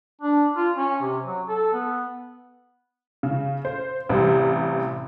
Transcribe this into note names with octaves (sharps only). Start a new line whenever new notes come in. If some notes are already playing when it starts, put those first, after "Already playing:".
D4
F4
C#4
C3
F#3
A4
B3
C#3
C5
A1 C3 G3